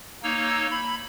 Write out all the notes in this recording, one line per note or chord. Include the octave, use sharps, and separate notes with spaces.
A#3 D#4 C#5 E6
B5